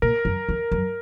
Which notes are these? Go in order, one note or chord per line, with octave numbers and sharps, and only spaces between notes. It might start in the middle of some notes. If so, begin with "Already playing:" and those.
A#2 A#4
F#2
F2
F#2